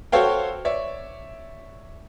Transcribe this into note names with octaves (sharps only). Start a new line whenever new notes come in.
F#4 A4 C5 C#5 F5 G5
C#5 D5 E5